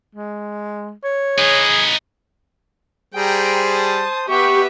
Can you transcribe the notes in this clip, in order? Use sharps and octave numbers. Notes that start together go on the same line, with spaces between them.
G#3
C#5
D#4 G#4 B4
G3 G#4 C5 G5 A#5
A5 D#6
B3 G4 B4 E5 C#6